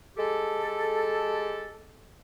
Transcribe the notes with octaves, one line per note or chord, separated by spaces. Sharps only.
G#3 G4 A4